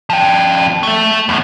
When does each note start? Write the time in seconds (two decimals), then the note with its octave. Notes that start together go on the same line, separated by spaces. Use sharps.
0.10 F3 G5
0.83 A3 E5
1.29 E2 A2